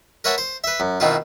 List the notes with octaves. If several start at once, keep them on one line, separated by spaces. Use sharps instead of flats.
A#4 B4 C#5 E5 F#5 A5
C5
B4 E5
F#2
B2 D#3 C4 E4 F4